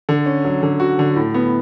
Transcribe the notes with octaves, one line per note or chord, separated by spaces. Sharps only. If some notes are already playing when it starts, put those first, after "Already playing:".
D3
C#4
F#3
D3
F#4
D3
A2
B3